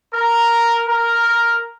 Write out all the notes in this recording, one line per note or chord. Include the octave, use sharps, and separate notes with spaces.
A#4
A#4